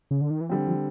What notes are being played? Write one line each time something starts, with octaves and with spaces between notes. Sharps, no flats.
C#3
D3
D#3
E3
D3 F3 G3 C4
F3